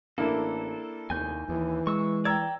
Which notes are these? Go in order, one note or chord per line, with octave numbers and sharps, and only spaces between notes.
A1 A#3 D4 E4 A4
F1 D#2 G#5 G6
D#2 E3
G#3 C#6 E6
D5 G5 A#5 E6 G#6